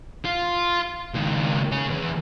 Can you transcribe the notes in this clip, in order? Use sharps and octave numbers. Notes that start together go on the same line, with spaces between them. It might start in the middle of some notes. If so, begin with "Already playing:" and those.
F4
C#2 D#3
C#3 G#5
E2